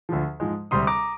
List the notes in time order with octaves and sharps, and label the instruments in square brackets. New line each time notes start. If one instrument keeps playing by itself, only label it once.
[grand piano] D2 D3 F3
G#2 F3 G#3
D2 C3 G3 C4 C6 D#6
A#5 D6